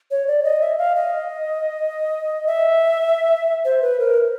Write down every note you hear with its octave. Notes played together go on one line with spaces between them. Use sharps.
C#5
D5
D#5
E5
F5
D#5
E5
C5
B4
A#4